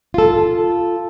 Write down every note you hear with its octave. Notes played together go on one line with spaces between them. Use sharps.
F4 A4